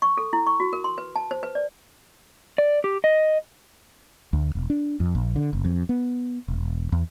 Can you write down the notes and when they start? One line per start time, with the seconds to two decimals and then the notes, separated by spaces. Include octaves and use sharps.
0.02 C#6
0.17 A4
0.33 E4
0.47 C#6
0.60 F#4
0.73 A#4
0.84 C6
0.98 B4
1.16 A5
1.31 C5
1.43 B4
1.55 D5
2.58 D5
2.84 G4
3.04 D#5
4.33 D2
4.55 E1
4.70 D4
5.00 F2
5.15 A#1
5.36 D3
5.53 F#1
5.65 F2
5.89 B3
6.48 E1
6.92 E2